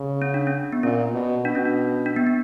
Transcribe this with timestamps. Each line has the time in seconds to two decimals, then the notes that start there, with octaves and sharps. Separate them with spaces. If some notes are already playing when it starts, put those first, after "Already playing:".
Already playing: C#3
0.22 C#4
0.34 D4
0.47 C#4
0.72 B3
0.83 A#2 C#4
1.13 B2
1.45 B2 D4
1.55 C#4
1.65 D4
2.06 D4
2.16 B3
2.27 B3